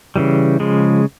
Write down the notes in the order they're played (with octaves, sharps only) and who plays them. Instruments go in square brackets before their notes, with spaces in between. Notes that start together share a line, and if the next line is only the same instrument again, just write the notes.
[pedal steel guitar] C#3 E3 G3
C#3 F3 G#3